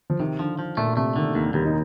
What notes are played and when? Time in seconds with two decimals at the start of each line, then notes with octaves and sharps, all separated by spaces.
0.10 F3
0.19 C3 D#3
0.39 D3 F3
0.59 F3
0.77 A#2 A3
0.96 C3 A3
1.16 D3 D#3
1.35 D#2
1.54 D#2 G3
1.65 D#4